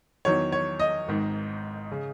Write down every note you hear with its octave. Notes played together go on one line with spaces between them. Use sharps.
E2 D#3 F#3 C#5
C#5
D#5
G#1 G#2 D#3
C#3